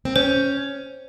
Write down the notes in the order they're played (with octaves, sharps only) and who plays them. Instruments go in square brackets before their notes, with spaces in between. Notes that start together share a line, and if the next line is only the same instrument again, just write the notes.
[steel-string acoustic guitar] C4
[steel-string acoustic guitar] C#4 [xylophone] C5